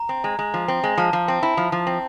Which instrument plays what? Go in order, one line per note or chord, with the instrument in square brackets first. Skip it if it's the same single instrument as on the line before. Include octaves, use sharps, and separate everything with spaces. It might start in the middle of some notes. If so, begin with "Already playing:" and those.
Already playing: [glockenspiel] A#5
[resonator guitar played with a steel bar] C4
G#3
G#3
F3
C4
G#3
[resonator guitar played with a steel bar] F3 [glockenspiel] A5
[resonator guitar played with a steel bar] F3
C4
E4
F3
F3
C4